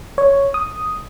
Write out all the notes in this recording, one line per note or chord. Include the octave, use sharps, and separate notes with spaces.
C#5
D#6